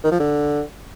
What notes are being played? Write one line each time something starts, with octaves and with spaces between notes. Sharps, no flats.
D#3
F3
D3